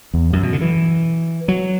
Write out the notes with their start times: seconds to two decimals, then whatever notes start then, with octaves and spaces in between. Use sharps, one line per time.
0.14 E2
0.33 F#2
0.43 B2
0.53 D3
0.61 E3
1.48 F#3